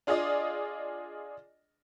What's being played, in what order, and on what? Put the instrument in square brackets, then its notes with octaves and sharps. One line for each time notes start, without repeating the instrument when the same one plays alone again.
[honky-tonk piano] D4 F4 G#4 D5 D#5